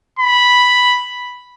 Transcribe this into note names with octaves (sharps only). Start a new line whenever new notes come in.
B5